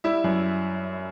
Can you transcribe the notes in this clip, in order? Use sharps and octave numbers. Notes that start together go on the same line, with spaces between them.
G3 E4 E5
F#2